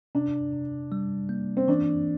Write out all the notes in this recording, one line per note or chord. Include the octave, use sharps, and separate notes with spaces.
C3 D4
C3
G3
A#3
C4
E3 D4